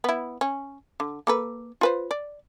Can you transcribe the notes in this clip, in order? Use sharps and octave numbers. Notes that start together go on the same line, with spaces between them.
B3 E4
C#4
D3
A#3 A4 B4
F4 B4 C5
D5